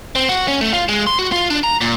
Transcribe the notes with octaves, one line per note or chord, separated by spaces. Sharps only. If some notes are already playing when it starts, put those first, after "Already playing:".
C4
F#4
C#4
A3
F4
G#3
C6
F#4
F4
D4
A#5
A#2